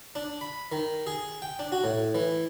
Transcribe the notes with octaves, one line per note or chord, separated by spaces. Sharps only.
D4
B5
D#3
G#4
G5
D4
F#4
A2
E3